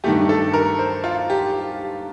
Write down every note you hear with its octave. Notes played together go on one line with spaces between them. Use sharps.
G2 D#3 A3 G4
A4
A#4
C5
F4
G4